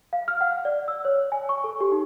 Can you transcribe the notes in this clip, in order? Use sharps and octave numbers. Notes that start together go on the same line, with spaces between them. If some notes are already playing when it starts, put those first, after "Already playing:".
F5
F6
F#5
D5
E6
C#5
G#5
C#6
A4
G4
D#4